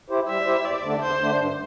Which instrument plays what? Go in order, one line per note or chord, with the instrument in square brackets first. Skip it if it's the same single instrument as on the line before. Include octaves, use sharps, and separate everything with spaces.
[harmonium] E4 G4 C5
[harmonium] G3 [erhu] E5
[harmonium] E4 G4 C5
[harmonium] E2 [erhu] D5
[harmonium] D3 A3 D4
[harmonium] E2 [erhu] C5
[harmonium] D3 A3 D4
G2